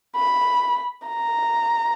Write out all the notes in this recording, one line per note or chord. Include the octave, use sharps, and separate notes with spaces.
B5
A#5